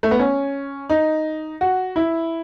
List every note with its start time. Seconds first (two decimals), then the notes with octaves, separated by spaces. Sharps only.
0.03 A3
0.11 B3
0.19 C#4
0.90 D#4
1.61 F#4
1.96 E4